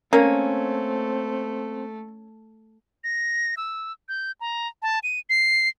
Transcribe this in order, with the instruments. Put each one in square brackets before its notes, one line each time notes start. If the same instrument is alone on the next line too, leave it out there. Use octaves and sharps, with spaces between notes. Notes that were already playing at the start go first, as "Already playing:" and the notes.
[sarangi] A3 [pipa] A#3 [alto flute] C4 [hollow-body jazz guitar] C#4
[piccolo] A#6
E6
G6
A#5
A5
D#7
C7